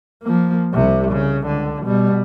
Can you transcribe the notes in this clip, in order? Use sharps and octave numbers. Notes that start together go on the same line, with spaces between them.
F3 A#3
C2 C3
C#3
C#2 D3
B2 G3